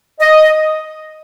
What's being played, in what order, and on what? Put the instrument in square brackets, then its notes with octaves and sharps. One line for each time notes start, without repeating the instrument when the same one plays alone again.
[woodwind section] D#5